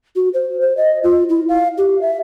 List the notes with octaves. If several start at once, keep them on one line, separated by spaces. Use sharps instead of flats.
F#4
C5
C5
D#5
F4
E4
F5
G4
E5